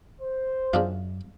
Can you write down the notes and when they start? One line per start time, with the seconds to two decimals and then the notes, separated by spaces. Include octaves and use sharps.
0.21 C5
0.73 F#2 C#3 D4 F4